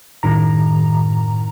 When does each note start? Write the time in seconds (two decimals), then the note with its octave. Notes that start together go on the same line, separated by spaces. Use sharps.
0.23 F#2 A2 D#3 A#5